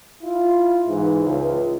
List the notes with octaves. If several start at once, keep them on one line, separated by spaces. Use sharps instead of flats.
E4 F4
G#2 E3
C#2